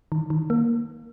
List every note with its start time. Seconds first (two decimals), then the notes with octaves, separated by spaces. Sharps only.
0.12 D#3
0.30 D#3
0.50 A#3